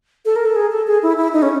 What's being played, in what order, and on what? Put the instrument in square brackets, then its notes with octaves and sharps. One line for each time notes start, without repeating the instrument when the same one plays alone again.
[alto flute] A4
A#4
A4
G#4
A4
G#4
E4
E4
D#4
C#4